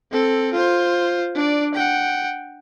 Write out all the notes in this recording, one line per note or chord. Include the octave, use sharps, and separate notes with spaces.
C4 A4
F4 C5
D4 D5
F#5 G5